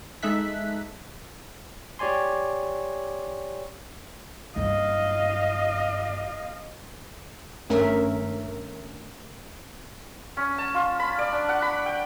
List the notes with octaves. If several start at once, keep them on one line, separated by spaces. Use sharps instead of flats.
G#3 D#4 A4 E5 F#6 B6
G4 C#5 D5 G#5 C6
F#1 G2 D#5 F5
G#1 G2 A3 C#4 A#4 E5
C#4
A5
F4
B5
D5
D4
F#5
B5
G5